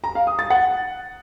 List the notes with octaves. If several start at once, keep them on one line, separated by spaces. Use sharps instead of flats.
A#5
F5
D#6
A6
F#5